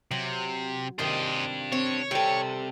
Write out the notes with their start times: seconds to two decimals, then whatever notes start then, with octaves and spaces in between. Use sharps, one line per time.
0.11 C3 F#3
0.99 C3 D#3 D4 F4 G4 C5 D#5
1.72 C4 C#5
2.11 C3 G3 C4 A4 G5